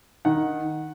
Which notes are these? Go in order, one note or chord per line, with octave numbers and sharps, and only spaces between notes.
D#3 F#5